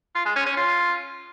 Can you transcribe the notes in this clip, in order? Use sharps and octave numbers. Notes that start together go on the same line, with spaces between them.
F4
G#3
C#4
C#4
F4